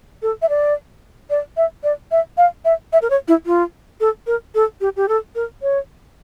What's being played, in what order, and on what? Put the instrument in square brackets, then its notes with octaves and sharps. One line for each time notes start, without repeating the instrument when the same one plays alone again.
[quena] A4
E5
D5
D5
E5
D5
E5
F5
E5
E5
A#4
C#5
E4
F4
A4
A#4
A4
G4
G4
A4
A#4
C#5